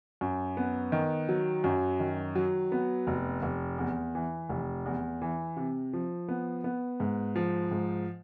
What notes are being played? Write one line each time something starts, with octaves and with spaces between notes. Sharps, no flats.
F#2
B3
D#3
F#3
F#2
D#3
F#3
B3
F1
F1
E2
E3
F1
E2
E3
C3
F3
B3
B3
G#2
F3
G#2